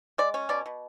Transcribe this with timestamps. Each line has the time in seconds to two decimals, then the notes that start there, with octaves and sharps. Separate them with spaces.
0.18 G#3 D5
0.34 C#4
0.49 B2 D5
0.66 B2